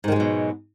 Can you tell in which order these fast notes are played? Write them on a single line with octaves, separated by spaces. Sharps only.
G#2 D#3 G#3 F#3 B2